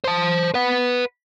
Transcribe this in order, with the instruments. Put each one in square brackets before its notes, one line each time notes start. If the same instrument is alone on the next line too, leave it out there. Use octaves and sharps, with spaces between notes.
[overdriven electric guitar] C5 A5
B4 F#5